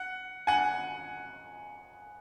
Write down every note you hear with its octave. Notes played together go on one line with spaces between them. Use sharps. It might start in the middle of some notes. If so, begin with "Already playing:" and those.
Already playing: F#5
F#5 G#5